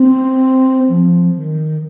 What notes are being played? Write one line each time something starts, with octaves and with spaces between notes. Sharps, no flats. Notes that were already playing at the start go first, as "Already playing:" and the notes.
Already playing: C4
F3
D#3